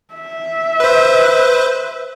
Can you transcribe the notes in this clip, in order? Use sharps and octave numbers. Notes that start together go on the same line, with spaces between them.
E5
B4 C5